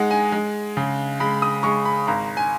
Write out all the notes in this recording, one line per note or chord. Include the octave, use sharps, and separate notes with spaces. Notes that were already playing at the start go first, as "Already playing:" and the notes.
Already playing: G#3 D#4 F#5
G#5
G#3
C#3
G#3 B5
D#6
G#3 C#6
B5
G#1 A#5
G#5